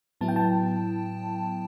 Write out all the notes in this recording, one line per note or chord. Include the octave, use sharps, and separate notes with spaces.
A2 F#3 B3 E4 A5
G5
A5